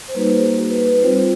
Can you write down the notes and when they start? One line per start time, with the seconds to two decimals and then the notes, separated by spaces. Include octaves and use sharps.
0.08 C5
0.14 G3 A#3 D#4 F#4 B4
0.26 C5
0.37 G#4
0.58 F#4
0.70 B4
0.80 B4
1.02 G3 C4 F4 C5